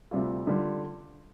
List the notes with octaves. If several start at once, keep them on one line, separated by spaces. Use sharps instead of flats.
D2 C3 G3 C4 F4
D3 G3 F4